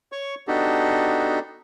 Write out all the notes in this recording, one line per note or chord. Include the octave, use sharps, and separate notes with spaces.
C#5 C#6
B3 D4 D#4 F#4 G4 A4